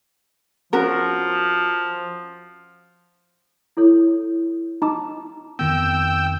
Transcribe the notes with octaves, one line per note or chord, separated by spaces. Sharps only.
F3 C#4 F#4 A#4
E4 A4 C#5
D#4 A5 A#5 D6
F2 D#3 B3 G5 E6